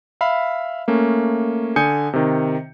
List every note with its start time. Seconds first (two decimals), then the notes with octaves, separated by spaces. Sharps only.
0.21 E5 F5 B5
0.88 A3 A#3 C#4
1.76 D3 G#5 D#6 G6 C#7
2.13 C3 D#3